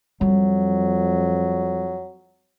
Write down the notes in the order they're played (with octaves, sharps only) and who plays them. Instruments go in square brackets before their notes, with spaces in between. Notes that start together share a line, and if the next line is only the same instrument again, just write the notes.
[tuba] F2 [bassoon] F#3 [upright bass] G3